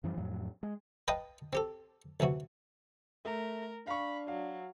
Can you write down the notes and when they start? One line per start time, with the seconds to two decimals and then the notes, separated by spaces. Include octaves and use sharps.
0.04 F#2 E3 F3 G3
0.17 F2 A2 F#3
0.63 G#3
1.08 B4 D#5 F5 G5 A5 D#6
1.53 C4 G4 A4
2.20 D2 C3 E3 F#4
3.25 A3 A#4
3.87 D4 F5 B5 C#6
4.28 F#3 F5